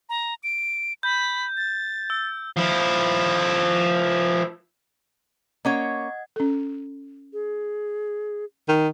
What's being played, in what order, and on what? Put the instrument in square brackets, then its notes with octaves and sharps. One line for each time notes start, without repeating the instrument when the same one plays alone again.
[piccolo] A#5
D7
[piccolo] B5 [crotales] G6
[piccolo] A6
[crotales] E6
[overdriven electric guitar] F3 E4
[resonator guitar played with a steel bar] A#3 C#4 C#5 [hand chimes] D#5 F#5 G#6
[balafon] C#4 A4
[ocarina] G#4
[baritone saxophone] D#3